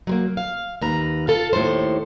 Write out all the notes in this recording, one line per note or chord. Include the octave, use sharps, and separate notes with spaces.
F#3 G#3 A#3
F5
D#2 B4 A#5
F4 A4 F5 A5
D#2 A2 C4 A4 C5